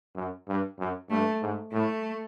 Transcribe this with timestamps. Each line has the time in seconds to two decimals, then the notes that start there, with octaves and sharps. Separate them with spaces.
0.15 F#2
0.48 G2
0.79 F#2
1.10 G2 A3
1.42 G#2
1.72 A2 A3